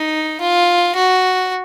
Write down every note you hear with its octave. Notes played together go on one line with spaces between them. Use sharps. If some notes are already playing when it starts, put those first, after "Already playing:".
Already playing: D#4
F4
F#4